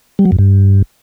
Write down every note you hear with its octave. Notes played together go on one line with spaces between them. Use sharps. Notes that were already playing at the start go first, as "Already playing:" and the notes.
G3
F#3
F#2
G2